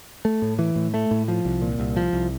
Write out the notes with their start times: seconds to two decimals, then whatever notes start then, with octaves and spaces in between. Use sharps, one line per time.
0.25 A3
0.42 A2
0.59 E3
0.76 A2
0.94 A3
1.11 A2
1.28 F3
1.45 C2
1.62 A#2
1.79 C2
1.96 F3
2.13 C2